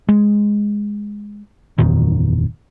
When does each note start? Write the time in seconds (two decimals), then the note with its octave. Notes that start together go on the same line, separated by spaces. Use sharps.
0.09 G#3
1.78 F#1 E2 A#2 D#3